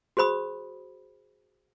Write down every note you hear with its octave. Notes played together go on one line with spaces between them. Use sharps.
F#4 G#4 C5 B5 D#6